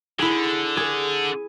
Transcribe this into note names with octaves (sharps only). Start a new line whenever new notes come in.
D3 E4 G#4
G#4